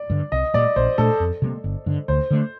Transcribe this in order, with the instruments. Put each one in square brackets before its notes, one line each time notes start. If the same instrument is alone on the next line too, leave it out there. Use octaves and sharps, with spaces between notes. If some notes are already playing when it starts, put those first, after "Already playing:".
Already playing: [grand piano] D5
[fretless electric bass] G2 D3
[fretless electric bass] C2 [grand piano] D#5
[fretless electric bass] A#2 G3 [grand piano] D5
[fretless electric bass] A#1 [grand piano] C5
[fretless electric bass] A#2 A3 D4 [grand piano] A4
[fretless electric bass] F2
C3 G3 A#3
G1
G2 D3
[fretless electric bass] D2 [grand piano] C5
[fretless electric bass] D3 A3